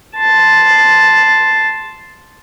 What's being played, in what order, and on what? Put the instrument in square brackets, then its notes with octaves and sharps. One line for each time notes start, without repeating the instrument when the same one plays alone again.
[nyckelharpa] A5 C6